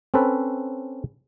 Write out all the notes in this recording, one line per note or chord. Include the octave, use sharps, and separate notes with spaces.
C4 C#4 A4 B4